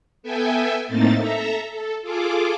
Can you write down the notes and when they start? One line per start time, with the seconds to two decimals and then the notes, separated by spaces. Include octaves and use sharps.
0.23 B3 A4 E5 G5 G#5
0.88 A2 A3 A#3 C4 D#4 A6
1.18 A4 E5 A#5
1.71 A4
2.02 F4 G#4 A4 D6